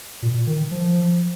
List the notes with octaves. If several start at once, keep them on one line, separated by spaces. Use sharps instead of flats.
A#2
D#3
F3